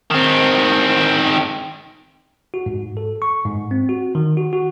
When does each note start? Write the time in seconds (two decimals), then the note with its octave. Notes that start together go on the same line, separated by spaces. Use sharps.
0.11 D#3 C4
2.54 F#4
2.66 G#2
2.97 A4
3.22 C#6
3.45 G#2
3.71 C4
3.89 F#4
4.15 D#3
4.37 F#4
4.53 F#4